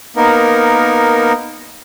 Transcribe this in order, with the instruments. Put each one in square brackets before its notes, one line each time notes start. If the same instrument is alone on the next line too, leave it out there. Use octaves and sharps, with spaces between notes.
[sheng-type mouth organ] A#3 B3 D#4 A#4